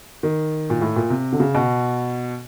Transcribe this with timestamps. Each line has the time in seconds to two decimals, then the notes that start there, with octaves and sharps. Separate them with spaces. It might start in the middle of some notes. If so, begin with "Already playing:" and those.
0.23 D#3
0.70 A#2
0.81 A2
0.96 A#2
1.10 C3
1.33 D3
1.40 C#3
1.55 B2